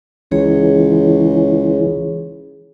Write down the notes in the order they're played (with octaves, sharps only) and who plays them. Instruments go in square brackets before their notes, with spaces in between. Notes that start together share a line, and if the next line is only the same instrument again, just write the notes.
[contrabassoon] C#2 [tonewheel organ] E3 [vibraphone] G#4 C#5